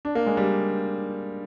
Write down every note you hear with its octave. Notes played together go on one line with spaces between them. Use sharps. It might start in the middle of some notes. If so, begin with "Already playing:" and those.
D4
A#3
G#3
G3